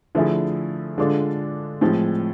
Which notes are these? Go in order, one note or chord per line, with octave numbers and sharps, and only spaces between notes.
D3 F3 A3 E4 G#4
D3 G#3 D4 F4 A4
A2 F3 G#3 C4